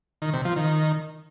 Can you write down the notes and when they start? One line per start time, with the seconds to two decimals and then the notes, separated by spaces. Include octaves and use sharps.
0.22 D#3
0.33 C3
0.45 F3
0.56 D#3